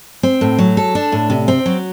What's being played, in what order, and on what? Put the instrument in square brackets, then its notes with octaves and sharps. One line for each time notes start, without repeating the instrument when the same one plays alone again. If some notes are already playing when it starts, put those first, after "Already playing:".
[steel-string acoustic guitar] C4
A2
F#3
A4
D4
A2
C3
C4
F#3